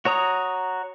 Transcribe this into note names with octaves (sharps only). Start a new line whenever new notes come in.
F#4 C#5 A#5 D#6